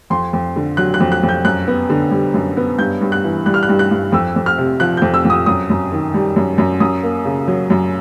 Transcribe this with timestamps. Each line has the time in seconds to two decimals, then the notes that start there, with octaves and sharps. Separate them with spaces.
0.10 F2 C6
0.33 F2
0.56 D3
0.77 F#3 F#6
0.94 F#6
1.00 F2
1.12 F#6
1.23 F2
1.29 G6
1.45 F#2 F#6
1.67 B3
1.90 D3
2.11 G3
2.34 F#2
2.57 B3
2.78 G2 G6
3.01 G2
3.12 F#6
3.24 E3
3.46 G3 F#6
3.54 F6
3.63 F#6
3.69 G2
3.79 F#6
3.91 G2
4.12 F2 E6
4.36 F2
4.46 F6
4.58 C3
4.80 F3 F#6
4.97 F2 G6
5.14 E6
5.25 F2
5.30 D#6
5.46 F#2 D#6
5.70 F#2
5.92 D#3
6.14 G3
6.36 F#2
6.58 F#2
6.80 F#2 D#6
7.03 A#3
7.25 C#3
7.48 F#3
7.70 F#2